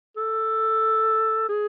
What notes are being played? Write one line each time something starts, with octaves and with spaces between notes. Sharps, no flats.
A4
G#4